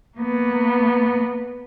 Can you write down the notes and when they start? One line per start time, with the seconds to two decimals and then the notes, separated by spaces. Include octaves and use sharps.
0.18 A#3 B3